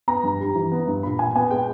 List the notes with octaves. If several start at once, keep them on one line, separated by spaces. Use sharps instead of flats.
B3 A#5
G2
G3
E3
B3
G2
A#2 B5
A#2 G#5
B3 G#5
G#3 G5